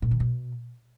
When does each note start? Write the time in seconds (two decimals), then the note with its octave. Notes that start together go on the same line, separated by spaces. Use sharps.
0.02 A#2
0.11 D#3
0.20 B2